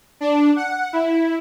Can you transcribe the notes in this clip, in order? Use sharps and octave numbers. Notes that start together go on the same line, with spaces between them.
D4
F#5
E4